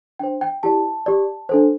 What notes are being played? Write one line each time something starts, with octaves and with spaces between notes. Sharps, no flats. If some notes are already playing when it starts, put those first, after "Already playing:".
D4 C5 G5
G5
E4 G4 D5 A5
G4 D5
D4 A4 C5